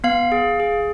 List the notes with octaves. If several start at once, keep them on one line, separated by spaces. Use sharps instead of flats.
B3 F5
G#4
G#4